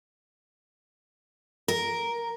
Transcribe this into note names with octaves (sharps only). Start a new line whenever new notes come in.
A#4